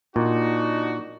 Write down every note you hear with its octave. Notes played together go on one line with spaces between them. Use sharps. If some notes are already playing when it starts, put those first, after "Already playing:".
A#2 D4 D#4 F#4